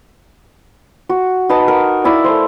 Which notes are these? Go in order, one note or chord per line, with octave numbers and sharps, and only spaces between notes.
F#4
D#4 B4 D#5 A5
A#4 F#5
E4 D5 F5 G#5
A3 C5